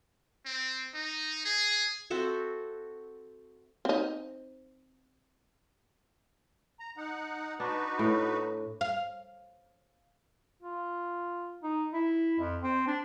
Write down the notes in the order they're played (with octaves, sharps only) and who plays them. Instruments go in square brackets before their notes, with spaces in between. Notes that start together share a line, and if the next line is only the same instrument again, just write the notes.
[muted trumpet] C4
D#4
G#4
[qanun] C4 F#4 A4 E5
[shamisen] C4 D#4
[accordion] A#5
D#4 F#5
[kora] D4 [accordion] D#4 F#4 B4
[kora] A2
[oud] F5
[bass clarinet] F4
D#4
E4
F2
C4
D4